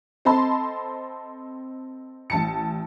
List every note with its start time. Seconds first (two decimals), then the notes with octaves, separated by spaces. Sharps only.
0.25 C4 A4 D#5 A5 B5 C6
2.30 A1 A5 C#7